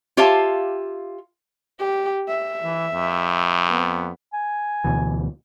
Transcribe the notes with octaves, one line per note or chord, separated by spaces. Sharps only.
F4 G4 C#5 E5 F5 A5
G4
E5
E3
F2
B3
G#5
D2 B2 E3